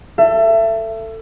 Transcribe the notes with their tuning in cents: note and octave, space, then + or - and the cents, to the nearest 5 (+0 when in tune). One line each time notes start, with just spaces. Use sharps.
A4 +20 E5 +25